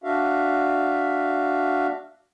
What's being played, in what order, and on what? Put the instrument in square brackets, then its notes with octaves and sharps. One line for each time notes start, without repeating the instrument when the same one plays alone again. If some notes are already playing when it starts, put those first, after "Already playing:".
[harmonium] D4 F#4 E5 F5